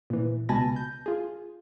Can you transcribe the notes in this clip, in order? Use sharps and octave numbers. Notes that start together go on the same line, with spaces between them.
A#2 E3
C#2 B2 G#5 A5 B5 A#6
G6
F4 G#4